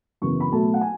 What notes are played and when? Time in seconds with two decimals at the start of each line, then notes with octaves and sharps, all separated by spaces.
0.22 F#2 C#3 E3 B3 C#6
0.40 B5
0.51 B2 F#3 A3 A5
0.74 F#5
0.81 G#5